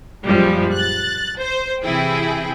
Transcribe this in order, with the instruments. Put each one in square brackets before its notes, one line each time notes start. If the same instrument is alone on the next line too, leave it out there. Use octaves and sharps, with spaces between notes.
[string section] F#2 A#2 F3 G3 G#3
F#6 A6
C5
C3 E3 E4 G#4 G5